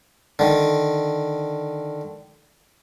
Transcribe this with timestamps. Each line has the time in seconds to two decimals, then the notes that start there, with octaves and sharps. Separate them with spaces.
0.39 D3 D#3